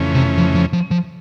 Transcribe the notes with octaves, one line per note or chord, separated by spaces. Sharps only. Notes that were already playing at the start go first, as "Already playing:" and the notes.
Already playing: F2 C#3 E3 A3 C#4
C3
F3
F3
F3
F3